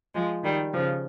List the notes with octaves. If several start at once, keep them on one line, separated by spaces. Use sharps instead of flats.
F3 G#3
D#3 G3
C#3 F3